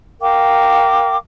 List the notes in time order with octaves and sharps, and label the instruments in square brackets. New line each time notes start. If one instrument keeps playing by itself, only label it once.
[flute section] A#4 F5 G5 D6